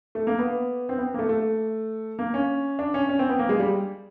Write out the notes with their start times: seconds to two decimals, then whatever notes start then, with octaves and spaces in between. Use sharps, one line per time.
0.15 A3
0.27 A#3
0.39 B3
0.89 C4
0.98 B3
1.14 A#3
1.19 A3
1.29 A3
2.19 A#3
2.34 C#4
2.79 D4
2.94 C#4
3.09 C#4
3.19 C4
3.29 B3
3.39 A#3
3.49 G#3
3.59 G3